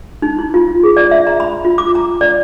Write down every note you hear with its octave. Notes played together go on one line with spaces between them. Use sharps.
D#4
E4
F4
G#4
D5
E5
A#5
B5
F4
D6
A#5
D5